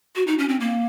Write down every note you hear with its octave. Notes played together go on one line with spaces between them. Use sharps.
F#4
D#4
C#4
C4
A#3